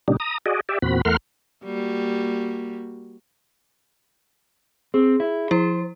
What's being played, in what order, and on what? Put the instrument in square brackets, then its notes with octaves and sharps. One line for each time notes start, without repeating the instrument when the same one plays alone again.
[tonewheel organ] A#2 C#3 G3 D4 D#4
A#5 D#6
F#4 G#4 D5 D#5
G4 D5 E5
E2 A#2 C4 F#4 B5
E2 A3 A#4 F#5 C6 F6
[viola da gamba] G3 A#3 F#4
[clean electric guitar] C4 [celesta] G#4
[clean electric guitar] E4
[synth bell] F3 E4 [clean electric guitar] C5